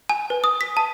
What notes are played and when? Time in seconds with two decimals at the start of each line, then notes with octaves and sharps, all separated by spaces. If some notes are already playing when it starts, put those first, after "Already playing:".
0.09 G#5
0.30 B4
0.44 D#6
0.61 B6
0.77 A5